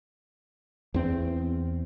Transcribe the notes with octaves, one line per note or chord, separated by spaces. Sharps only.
E2 C4